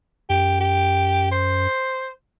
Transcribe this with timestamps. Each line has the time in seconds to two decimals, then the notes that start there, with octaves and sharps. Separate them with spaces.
0.30 F#2 G4
0.60 G4
1.32 C5